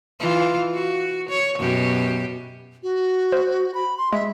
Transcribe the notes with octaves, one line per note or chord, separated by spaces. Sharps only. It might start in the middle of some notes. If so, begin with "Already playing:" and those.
E3 F4
F#4
C#5
F#2 B2 G4
F#4
C5
B5
C6
G#3 E5